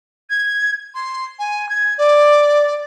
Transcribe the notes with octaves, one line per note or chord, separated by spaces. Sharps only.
G#6
C6
G#5
G#6
D5